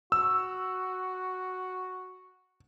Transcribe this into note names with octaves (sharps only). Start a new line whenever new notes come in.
F#4 E6